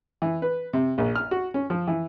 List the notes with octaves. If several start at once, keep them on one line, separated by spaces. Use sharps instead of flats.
E3
B4
C3
A#1
F6
F#4
C#4
F3
E3